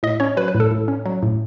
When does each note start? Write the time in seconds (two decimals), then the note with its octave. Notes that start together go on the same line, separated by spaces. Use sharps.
0.03 A2 D#5
0.20 C#4 C#5
0.37 F#3 B4
0.48 B4
0.55 A2
0.60 A4
0.71 A2
0.88 C#4
1.06 F#3
1.23 A2